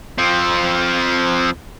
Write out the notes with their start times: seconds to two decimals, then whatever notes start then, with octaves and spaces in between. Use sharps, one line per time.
0.18 F3 C4